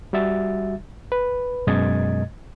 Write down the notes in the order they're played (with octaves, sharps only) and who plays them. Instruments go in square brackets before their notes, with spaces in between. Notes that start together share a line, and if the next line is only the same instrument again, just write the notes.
[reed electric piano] G3 F#4 E5 A6
B4
F#2 B2 G#3 D#5 G#6 A6